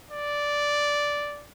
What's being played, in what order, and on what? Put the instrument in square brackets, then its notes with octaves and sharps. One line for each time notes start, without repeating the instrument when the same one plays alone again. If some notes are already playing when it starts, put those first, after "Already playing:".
[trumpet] D5